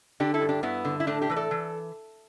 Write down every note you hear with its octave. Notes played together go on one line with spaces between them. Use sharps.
D3 D4 G4
E4 A4
G2
D4 G4
G2 B3 E4
D3
E4
A2 A3 D4
D4 G4
E3 B4
A4 D5
E3